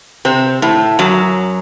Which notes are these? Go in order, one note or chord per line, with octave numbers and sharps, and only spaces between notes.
C3 C4
A2 A3
F#2 F#3